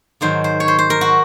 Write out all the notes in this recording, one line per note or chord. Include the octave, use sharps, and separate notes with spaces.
G#2 D#3 F#3 C5
C5
C#5
C5
C5
A#4
F#4